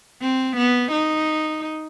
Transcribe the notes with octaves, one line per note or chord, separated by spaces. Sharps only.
C4
B3
D#4